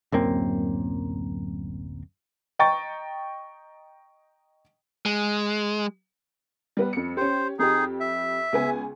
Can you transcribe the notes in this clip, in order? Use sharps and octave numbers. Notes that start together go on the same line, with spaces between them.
D1 F#2 A#3 C4
D#5 G5 A#5 C#6 A6
G#3
G3 B3 B4
F2 C#7
C#4 G4 C5
F2 D#4 G4 G#4
E5
C#2 B3 G#5